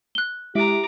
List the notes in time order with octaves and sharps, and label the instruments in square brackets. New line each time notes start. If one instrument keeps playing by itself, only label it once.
[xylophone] F#6 G7
[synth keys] G#3 E4 E5 [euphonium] G4 [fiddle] A#5 D6